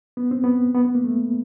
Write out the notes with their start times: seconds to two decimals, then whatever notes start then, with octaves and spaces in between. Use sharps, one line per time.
0.17 B3
0.31 C4
0.44 B3
0.74 B3
0.85 B3
0.95 A#3
1.04 A3